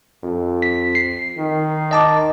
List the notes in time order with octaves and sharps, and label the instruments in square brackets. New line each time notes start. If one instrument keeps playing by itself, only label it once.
[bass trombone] F2
[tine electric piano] B6
C7
[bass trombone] D#3
[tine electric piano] D#5 A5 D6